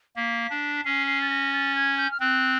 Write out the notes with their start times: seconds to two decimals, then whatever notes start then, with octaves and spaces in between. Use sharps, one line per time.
0.16 A#3 B6
0.50 D4
0.76 B6
0.84 C#4 C7
1.07 C7
1.21 A6
1.30 A#6
1.53 A6
1.75 G#6
1.98 G6
2.11 F6
2.20 C4 F#6